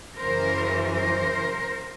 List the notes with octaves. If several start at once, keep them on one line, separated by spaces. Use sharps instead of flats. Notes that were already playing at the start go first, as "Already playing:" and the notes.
F#2 C#3 E3 A#4 C5
A#4 C5